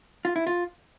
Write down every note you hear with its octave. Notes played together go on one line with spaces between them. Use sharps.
F4
E4
F4